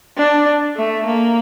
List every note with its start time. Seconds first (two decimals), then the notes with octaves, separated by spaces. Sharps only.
0.18 D4
0.77 A3
1.06 A#3